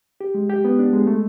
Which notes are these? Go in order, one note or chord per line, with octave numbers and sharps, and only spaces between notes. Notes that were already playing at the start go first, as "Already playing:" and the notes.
G4
G#3
G4
B3
D4
G#3
A3